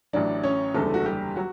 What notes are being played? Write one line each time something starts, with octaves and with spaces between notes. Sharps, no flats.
A1 A2 F#3 D4 D5
C#4 C#5
F#1 E2 D3 G3 A3 A4
F#4
G3 G4
F#3 F#4